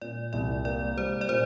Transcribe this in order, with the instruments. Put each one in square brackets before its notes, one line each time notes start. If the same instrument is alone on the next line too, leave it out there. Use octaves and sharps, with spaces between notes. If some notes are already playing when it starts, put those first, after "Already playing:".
[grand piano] A#2 [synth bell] D5
[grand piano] C2 [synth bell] D5
[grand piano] A#3 [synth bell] D5
[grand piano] G3 [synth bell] C5
[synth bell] D5
[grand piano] A#2 [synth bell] C5